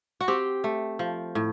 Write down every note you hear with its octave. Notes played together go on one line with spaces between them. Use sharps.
F#4
C4 G4
A3
F3
A2